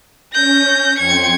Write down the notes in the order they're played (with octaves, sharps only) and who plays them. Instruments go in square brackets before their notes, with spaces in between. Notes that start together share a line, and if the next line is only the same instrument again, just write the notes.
[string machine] C#4 [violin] G6 A#6
[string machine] F2 G5 C6 [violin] G#6 C#7